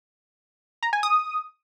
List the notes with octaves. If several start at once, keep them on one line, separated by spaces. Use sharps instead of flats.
A#5
G#5
D#6